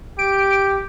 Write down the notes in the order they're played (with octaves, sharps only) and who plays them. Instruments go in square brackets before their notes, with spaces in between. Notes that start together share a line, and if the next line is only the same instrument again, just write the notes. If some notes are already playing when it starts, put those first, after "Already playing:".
[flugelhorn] G4 [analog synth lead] D7